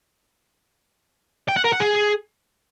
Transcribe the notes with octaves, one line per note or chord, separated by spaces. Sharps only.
G5
F#5
A#4
F#5
G#4